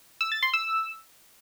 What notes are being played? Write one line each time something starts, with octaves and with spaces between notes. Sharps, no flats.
E6
A6
C6
E6